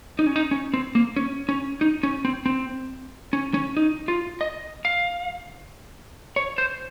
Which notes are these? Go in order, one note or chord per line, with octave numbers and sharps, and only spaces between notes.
D#4
C#4
D#4
C#4
C4
A#3
C#4
C#4
D#4
C#4
C4
C4
C#4
C#4
D#4
F4
D#5
F5
C#5
C5